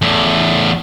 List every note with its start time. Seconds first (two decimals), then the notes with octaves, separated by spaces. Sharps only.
0.02 E2 A2